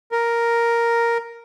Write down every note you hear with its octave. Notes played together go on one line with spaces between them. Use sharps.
A#4